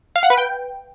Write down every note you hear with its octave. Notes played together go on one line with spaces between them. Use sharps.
F5
F#5
B4
G5